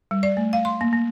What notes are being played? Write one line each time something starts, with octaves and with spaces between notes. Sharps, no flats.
G3
D5
A3
F5
C6
A#3
A#3